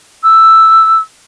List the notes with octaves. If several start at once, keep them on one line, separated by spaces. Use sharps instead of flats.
E6